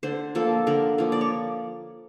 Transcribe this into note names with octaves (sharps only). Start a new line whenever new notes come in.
D3 C5
F3 A#3 A4
D3 A#4
F3 A#3
D5
C#5